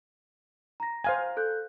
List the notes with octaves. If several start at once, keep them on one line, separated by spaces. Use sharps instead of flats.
A#5 A#6
C5 F5 G#5
A4 F#6 G6